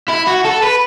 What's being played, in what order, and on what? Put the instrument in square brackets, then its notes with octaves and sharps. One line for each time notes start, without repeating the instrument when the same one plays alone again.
[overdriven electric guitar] E4
F#4
A4
B4